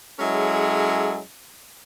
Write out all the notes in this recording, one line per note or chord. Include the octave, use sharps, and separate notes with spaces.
F#3 G#3 C#4 E4 G#4 A4